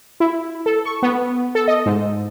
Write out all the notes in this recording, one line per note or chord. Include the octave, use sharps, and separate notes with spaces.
E4
A4
C#6
B3
A4
D#5
G#2